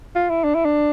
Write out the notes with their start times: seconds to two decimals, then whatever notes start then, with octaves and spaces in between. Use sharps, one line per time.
0.15 F4
0.30 E4
0.44 D4
0.55 E4
0.65 D4